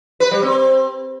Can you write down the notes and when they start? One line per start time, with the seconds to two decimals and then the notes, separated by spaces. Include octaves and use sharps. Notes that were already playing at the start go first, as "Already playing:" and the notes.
0.20 B4
0.31 G3
0.42 C4